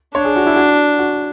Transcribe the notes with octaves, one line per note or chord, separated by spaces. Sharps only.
D4 C#5
G#4
F#4
E4
F#4
F#4